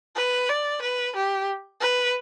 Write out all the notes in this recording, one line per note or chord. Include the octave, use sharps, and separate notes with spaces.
B4
D5
B4
G4
B4